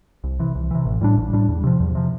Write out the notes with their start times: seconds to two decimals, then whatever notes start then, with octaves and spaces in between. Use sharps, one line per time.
0.24 C2
0.39 C3 E3
0.55 C2
0.71 C3 E3
0.85 A1
1.01 A2 G3 D4
1.18 A1
1.33 A2 G3 D4
1.48 E2
1.64 C3 F3
1.80 E2
1.95 C3 F3